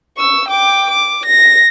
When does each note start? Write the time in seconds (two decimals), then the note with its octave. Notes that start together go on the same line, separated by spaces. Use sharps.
0.18 C#6 E6
0.48 G5 D6
0.90 D6
1.25 A#6